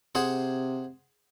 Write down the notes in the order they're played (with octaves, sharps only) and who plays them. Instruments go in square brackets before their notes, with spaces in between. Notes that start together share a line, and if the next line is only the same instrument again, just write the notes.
[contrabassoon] C3 [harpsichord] G#4 C5 F#5